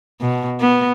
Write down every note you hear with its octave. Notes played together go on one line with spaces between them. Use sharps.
B2
B3